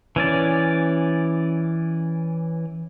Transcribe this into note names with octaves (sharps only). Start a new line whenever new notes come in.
E3 C#4 D5